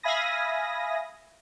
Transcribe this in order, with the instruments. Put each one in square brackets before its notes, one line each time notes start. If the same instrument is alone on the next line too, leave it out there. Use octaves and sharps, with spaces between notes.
[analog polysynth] E5 F5 G#5 B5 D#6 A#6